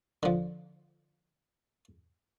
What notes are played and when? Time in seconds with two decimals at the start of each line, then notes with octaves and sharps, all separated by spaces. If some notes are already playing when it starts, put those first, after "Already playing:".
0.23 D3 F3